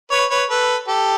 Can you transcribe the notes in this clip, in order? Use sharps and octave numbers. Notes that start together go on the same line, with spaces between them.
B4 C#5
B4 C#5
A4 B4
G4 A4